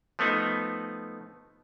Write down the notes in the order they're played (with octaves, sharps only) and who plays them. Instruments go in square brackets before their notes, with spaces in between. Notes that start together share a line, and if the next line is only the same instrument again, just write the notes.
[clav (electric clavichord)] F3 A3 B3 D#4